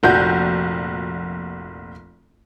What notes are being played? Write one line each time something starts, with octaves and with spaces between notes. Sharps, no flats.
F1 A#1 F#4 G6